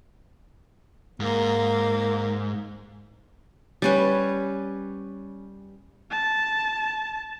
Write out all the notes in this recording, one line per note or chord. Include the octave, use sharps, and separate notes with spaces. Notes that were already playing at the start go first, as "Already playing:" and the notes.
G#2 A#3
G3 C#4 B4
A5